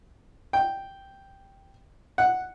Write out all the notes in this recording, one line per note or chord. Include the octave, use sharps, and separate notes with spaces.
G5
F#5